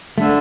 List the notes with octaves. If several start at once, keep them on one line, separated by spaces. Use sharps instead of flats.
D3 A3